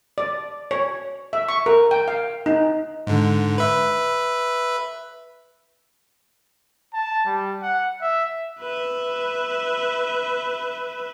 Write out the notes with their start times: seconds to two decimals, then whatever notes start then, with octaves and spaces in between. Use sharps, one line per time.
0.18 D5
0.71 C#5
1.33 E5
1.48 C#6
1.66 A#4
1.91 G5
2.08 F5
2.46 D#4
3.07 G#2 D3
3.58 B4 E5
6.94 A5
7.26 G3
7.62 F#5
8.01 E5
8.60 B4 E5